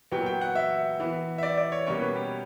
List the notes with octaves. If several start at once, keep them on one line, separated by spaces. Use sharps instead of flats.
A#2 F#3 B3 G5
G5
F#5
E5
E3 B3
E5
D5
D5
C#5
B2 G3 A#3 C#4 C#5
B4
G4